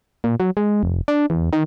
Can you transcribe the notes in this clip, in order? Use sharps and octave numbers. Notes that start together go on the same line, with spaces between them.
A#2
F#3
G#3
F1
D4
E2
D#3